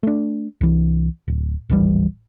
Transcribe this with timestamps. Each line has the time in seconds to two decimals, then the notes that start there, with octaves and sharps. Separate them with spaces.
0.03 A3 D4
0.61 C2 E3
1.28 D1
1.70 D1 G#1 E3 G3